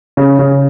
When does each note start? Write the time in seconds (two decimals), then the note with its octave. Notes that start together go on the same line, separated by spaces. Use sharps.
0.17 C#3
0.39 C#3